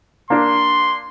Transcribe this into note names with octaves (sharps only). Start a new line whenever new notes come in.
A#3 D4 C6